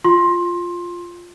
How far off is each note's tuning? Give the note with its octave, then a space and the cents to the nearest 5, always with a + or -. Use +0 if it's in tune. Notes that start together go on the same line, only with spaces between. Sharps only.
F4 +0 C6 +15